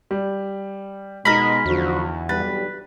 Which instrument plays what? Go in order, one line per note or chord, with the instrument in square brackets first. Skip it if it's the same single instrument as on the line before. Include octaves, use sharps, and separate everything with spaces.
[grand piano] G3
[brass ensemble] B2 [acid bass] G#3 [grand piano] D#4 A#6 B6 [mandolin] A#4 B5
[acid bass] E2 [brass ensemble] D3 F3 F#4
[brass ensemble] B1 G2 G3 [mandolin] B4 [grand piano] A6